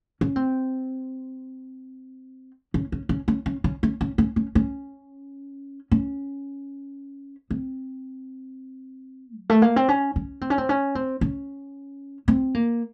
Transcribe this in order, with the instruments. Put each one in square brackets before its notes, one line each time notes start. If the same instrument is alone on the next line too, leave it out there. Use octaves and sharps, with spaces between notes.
[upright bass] C#4
C4
C#4
C#4
C#4
C#4
C#4
C#4
C#4
C#4
C#4
C#4
C#4
C#4
C4
F#3
A3
A#3
C4
C#4
C#4
C4
C#4
C4
C#4
C4
C#4
C4
A#3